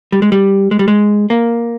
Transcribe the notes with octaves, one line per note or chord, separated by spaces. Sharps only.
G3
G#3
G3
G#3
G3
G#3
A#3